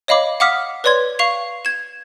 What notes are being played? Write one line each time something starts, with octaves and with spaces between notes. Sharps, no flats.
C#5 D#5 F5 B5 D6
F5 F#5 D6 D#6 F6 B6
B4 C#5 D5 C6 G#6
F5 C#6 C7 F7
G#6 E7